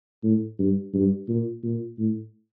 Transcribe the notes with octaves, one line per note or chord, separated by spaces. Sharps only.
A2
G2
G2
A#2
A#2
A2